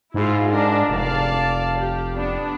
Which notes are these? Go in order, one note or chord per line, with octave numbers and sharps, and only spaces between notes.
G#2 E4 F4
D4 A#4
F1 D5 F5 A5
G4
B3 D4